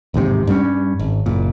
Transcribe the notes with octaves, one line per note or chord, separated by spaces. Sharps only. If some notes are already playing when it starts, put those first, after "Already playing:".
A1 D#2 G#2 C3
G2 G3 A#3 C#4
G#1
F#1 A#2